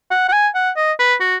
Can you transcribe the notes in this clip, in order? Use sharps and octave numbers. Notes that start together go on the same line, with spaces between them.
F#5
F#5
G#5
F#5
D#5
B4
F#4